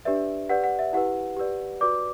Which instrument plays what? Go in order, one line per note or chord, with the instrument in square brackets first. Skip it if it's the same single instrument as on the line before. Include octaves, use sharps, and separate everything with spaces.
[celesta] D4 G4 B4 D5 E5
G4 B4 D5 F#5
F#5
E5
E4 G4 B4 F#5
G4 B4 D5
F#4 B4 D5 D6